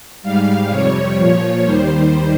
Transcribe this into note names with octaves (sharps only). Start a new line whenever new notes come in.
G#2 G3 F5
F2 C3 G3 C#5
A#2 F3
D#2 D#3 G3 C5